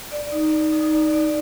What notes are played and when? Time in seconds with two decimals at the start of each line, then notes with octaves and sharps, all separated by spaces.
0.12 D5
0.32 D#4
0.52 D5
0.73 D#4
0.93 D5
1.13 D5